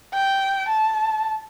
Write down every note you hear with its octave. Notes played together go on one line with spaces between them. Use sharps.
G5
A5